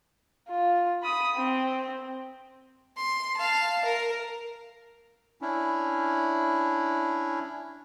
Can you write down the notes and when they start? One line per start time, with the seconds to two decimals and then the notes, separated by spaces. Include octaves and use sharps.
0.49 F4
1.03 B5 D#6
1.35 C4
2.96 C6
3.36 F5 A5
3.85 A#4
5.41 C#4 D4 E4